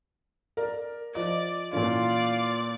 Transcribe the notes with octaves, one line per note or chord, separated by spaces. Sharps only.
A#4 D5
F3 D5 D#5
A#2 E3 C#4 F4 D5